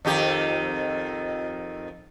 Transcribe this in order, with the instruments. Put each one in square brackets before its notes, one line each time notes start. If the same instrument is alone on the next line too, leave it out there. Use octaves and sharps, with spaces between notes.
[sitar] F2 D#3 G4